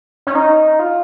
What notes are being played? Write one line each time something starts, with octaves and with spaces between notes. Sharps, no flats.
C#4
D#4
F4